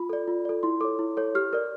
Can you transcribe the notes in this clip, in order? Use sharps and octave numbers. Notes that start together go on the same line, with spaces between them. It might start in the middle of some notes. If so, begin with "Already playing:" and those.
Already playing: F4 B5
A4 D5
F4
A4 D5
E4 C6
A4 C#5 D6
E4
A4 C#5
G4 F6
A#4 D5